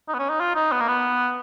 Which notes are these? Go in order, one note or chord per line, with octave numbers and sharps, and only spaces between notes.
D#4
B3
C#4
D#4
F4
D#4
B3
A#3
B3